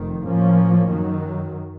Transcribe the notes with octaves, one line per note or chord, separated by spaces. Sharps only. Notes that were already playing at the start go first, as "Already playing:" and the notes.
Already playing: F1 F2 D#3
A2 F3 A#3 C#4
F#2 D#3 F#3